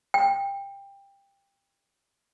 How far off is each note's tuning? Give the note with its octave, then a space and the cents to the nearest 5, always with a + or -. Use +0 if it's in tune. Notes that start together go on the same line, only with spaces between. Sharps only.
G5 +20